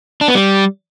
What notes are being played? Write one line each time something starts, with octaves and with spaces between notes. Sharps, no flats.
D4
B3
G3